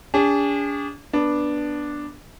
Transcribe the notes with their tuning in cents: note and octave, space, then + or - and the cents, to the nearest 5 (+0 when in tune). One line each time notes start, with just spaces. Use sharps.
D4 -40 G#4 -40
B3 -15 D4 +0